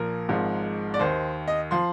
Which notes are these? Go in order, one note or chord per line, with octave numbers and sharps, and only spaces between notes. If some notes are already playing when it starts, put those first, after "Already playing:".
Already playing: A#1 A#2 F3 A#4
G#1 G#2 F3
D5
D#2 D#3 C5
D#5
F3 C6